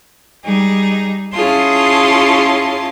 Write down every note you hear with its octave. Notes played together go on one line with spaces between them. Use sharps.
G3 D#4 G#4
C#4 E4 F4 G#4 A5 C6